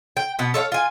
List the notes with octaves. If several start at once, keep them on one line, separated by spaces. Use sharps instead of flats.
G5
B2 B3
A4 C#5 E5 F5
F4 G#5